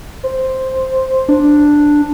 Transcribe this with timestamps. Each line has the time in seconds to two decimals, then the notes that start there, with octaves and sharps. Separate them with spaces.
0.24 C5
1.29 D4